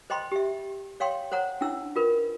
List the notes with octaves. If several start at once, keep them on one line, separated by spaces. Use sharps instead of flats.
C5 D#5 G5 B5 C6
G4 E5
C#5 F5 G5 C6
C5 C#5 F#5 A#5
C#4 D4 E4 E6
F4 A#4 B4